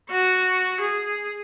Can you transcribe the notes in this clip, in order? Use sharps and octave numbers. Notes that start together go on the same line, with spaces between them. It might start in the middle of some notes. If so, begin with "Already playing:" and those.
F#4 C#6
G#4